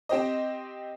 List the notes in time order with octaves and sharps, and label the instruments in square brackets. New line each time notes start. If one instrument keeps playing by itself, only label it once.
[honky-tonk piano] C4 G4 C5 D#5